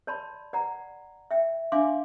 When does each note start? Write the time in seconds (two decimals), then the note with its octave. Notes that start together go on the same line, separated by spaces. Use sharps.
0.07 C#5 D5 A5 B5 C6
0.53 D5 F#5 A#5
1.31 E5 G5
1.72 D4 E5 F5 G#5 C6 D6